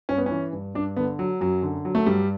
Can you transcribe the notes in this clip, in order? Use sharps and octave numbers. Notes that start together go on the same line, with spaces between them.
G2 C#4
B3
C#4
E3
G2
G2 D4
D3 B3
F#3
F#2 F#3
D3
F#3
A3
G2 G3